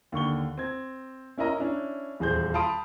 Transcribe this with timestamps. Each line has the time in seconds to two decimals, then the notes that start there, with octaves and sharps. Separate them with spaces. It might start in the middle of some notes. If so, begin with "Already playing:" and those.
0.12 D#2 D3 C#6 G7
0.57 C4 G#6
1.38 C#4 E4 A#4 D#5 A#5
1.59 C#4 D4 E4
2.20 D#1 E2 G#4 C5 G6
2.54 F5 A5 B5 C6 D#6 D7